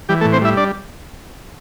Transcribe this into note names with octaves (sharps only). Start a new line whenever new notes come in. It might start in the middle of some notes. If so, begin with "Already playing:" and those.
E3 G3 G4
A3 A4
A2
C4 C5
G3 E4 E5
D4 D5